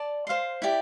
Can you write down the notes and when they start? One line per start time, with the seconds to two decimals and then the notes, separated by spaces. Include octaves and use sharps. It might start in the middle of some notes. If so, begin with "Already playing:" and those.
Already playing: D5 A5
0.27 C5 F5 C6
0.62 E4 G4 D5